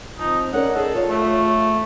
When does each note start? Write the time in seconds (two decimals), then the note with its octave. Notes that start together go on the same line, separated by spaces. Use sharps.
0.19 F3 C4 D#4
0.53 C#4 D#4 A#4 D5 F#5
0.75 G#4 A4 D#5
0.95 F4 C#5
1.10 A3